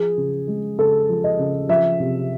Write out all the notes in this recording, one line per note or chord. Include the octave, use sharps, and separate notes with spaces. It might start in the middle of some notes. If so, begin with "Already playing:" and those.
Already playing: F3 G#4
C#3
G#3
C#3 A4
F3
D#5
C#3
F3 E5
C3